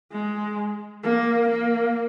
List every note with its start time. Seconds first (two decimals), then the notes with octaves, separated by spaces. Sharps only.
0.12 G#3
1.04 A#3
1.49 A#3